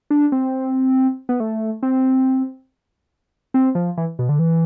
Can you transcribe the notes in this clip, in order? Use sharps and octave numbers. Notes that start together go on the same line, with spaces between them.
D4
C4
B3
A3
C4
C4
F3
E3
B2
D3
E3